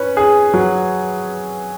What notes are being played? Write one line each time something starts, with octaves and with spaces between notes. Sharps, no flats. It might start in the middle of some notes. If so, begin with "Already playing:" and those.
Already playing: C#4 B4
G#4
F#3